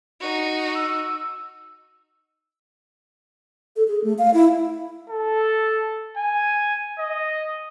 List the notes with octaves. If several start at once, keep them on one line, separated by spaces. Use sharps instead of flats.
D#4 F#4
E6
A4
G#4
A3
F5
E4
A4
G#5
D#5